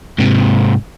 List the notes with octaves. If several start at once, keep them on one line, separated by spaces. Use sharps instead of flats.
G#2 C3